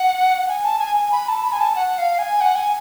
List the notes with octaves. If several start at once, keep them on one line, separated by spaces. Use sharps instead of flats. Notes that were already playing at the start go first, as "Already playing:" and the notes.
Already playing: F#5
F#5
G#5
A5
G#5
G#5
B5
A5
B5
G#5
A5
F#5
F5
G#5
F#5
G#5